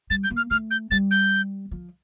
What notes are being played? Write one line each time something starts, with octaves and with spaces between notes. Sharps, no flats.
G3 A6
G6
A#3
F6
A3 F6
G6
G3 A6
G6
F3